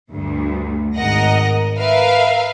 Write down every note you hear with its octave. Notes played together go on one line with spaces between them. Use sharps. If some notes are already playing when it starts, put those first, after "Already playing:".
D2 G2
G#1 A#4 D#5 F#5 A#6
A#4 B4 E5 F5